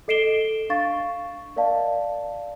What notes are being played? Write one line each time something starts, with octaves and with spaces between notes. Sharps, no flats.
A4 D#5 C7 D7 E7 G7
D4 F5 C#6 A6
A#4 D5 D#5 F5 A5